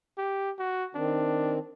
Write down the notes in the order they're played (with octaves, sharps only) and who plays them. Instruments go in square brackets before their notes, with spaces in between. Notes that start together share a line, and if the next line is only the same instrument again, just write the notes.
[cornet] G4
F#4
[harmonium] D#3 C4 [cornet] D4